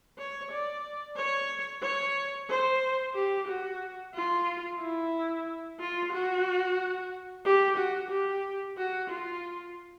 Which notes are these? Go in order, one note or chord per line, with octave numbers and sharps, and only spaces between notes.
C#5
D5
C#5
C#5
C5
G4
F#4
F4
E4
F4
F#4
G4
F#4
G4
F#4
F4